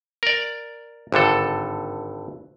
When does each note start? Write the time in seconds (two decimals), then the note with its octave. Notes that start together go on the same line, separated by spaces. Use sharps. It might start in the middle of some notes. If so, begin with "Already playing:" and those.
0.23 A#4 D5
1.12 G#1 G2 D3 A4